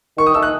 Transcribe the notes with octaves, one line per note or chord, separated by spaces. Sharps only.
D#3 C#6
D#6
A3 D#4 A4 E6
F#6